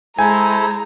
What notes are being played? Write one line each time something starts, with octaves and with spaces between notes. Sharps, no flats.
G#3 E4 A4 C5 G#5 A#5